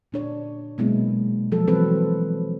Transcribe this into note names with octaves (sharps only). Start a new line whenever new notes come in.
A#2 D4 C#5
B2 F#3 G#3 A#3 B3 E4
F3 F#3 A4
E3 F#3 C4 A4 B4